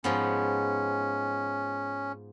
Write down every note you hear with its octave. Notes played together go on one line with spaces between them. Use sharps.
G#2 F3 B3 C#4